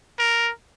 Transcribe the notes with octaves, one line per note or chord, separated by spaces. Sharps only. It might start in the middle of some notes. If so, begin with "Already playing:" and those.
A#4